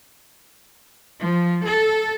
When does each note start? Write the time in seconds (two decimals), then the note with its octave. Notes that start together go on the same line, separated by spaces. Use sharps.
1.21 F3
1.66 A4